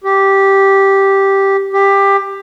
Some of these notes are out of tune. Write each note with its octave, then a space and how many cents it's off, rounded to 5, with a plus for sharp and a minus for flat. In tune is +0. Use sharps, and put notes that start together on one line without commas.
G4 -5
G4 +15